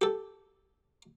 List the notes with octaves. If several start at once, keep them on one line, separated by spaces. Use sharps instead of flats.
G4 A4